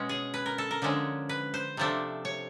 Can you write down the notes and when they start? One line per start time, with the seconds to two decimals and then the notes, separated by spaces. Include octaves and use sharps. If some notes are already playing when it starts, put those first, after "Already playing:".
Already playing: B2 G#3 C#4
0.09 G#4
0.34 B4
0.46 A#4
0.58 A4
0.71 A#4
0.82 D3 F3 G#3 C#4
1.29 B4
1.54 C5
1.77 C3 F3 A3 D4
2.25 C#5